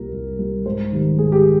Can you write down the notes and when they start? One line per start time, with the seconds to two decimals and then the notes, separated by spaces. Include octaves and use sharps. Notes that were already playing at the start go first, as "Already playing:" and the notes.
Already playing: C2 A#2 G3 A#4
0.12 C2
0.39 A#2 G3
0.66 G#2 C5
0.92 D#3 G3
1.19 G#2 G#4
1.32 G4